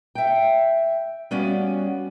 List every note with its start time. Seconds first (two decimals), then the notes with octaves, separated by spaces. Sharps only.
0.15 E5 G5
1.31 G3 B3 C#4 F#4 D5 F5